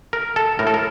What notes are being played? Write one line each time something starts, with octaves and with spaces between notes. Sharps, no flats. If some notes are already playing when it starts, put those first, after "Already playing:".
A#4
A4
A2 A#4
A4
A#4